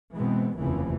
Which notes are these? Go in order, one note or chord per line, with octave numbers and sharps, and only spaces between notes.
B2 E3 G#3 B3 C4
F1 D#2 C#3 E3 F3